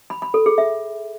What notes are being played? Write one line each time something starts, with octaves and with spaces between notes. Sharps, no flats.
B5
B5
A4
G#4
E5